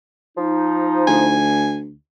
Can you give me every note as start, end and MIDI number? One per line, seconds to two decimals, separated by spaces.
0.38 1.44 53
0.38 1.44 63
1.08 1.96 38
1.08 1.76 80